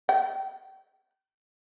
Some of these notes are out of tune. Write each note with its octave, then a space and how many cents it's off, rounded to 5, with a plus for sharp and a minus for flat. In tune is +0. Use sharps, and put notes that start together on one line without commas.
G5 -35